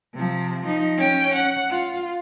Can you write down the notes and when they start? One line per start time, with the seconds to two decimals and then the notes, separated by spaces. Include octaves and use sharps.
0.14 C3 F3
0.65 F3 D#4
0.98 C#4 G5
1.35 F#5
1.71 F4